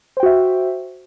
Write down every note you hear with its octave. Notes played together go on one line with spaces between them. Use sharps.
F#4 C5 E5 G5